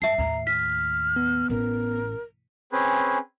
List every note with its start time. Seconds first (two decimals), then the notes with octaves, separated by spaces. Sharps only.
0.02 F#2 E5 A5 C7
0.18 D#2 A2 A#5
0.47 F6 B6
1.16 B3
1.50 A1 A#4
2.72 C4 C#4 G#4 B4